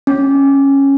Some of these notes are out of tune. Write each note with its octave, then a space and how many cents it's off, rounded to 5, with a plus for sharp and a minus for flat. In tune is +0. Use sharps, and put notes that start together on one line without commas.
C#4 -10